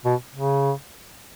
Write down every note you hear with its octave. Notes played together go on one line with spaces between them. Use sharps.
B2
C#3